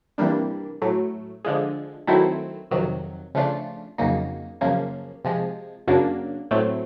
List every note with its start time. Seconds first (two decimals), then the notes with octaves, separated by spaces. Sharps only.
0.18 C3 E3 G3 A#3 D4
0.82 A2 F#3 A3
1.44 D3 F3 G#3
2.07 D#3 F#3 A3 C4 E4
2.71 F2 C3 D#3 F#3
3.35 C#3 F3 A3 D4 F4
3.98 F2 C#3 F#3 A#3 D#4
4.61 F#2 C#3 F3 A#3 C#4
5.24 C3 F3 G#3
5.87 F#2 C#3 F#3 A#3 D4
6.51 A2 F#3 A3 C4